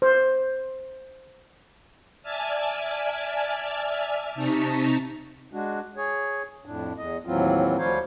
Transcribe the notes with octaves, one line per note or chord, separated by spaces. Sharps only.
C5
D5 E5 G#5 A5 F6 A6
C3 D#4 A5 A#5 C#6 B6
G#3 D4 F#4
G#4 C#5
F2 A2 D4
E2 D#5
D#2 A2 E3 F#3 C4 F4
D2 F3 G3 C5 C#5 F5